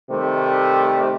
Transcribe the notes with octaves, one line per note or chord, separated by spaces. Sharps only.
C3 D#3 G3 A3